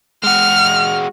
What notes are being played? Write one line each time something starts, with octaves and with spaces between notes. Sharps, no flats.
G#3 F#4 F6